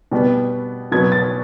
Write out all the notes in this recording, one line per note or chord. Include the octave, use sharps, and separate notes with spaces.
B2 G3 B3
B2 F#3 B3 G#6
A6